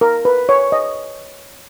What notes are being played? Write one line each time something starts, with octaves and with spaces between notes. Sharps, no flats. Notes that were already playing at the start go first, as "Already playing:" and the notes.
A#4
B4
C#5
D#5